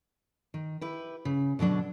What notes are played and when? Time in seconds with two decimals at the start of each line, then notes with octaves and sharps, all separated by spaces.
0.54 D#3
0.81 E4 G4 B4
1.25 C#3
1.59 B2 D3 F#3 D4